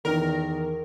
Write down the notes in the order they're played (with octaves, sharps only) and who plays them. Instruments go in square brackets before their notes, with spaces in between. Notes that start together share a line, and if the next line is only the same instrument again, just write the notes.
[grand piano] E2 D#3 E3 [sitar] A#4